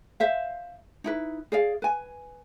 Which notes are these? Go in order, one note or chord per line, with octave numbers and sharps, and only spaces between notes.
C5 E5 F5
D#4 E4 B4
G#4 D5 F5
B4 G#5